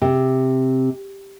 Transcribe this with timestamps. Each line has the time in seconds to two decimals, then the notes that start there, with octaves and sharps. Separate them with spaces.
0.01 C3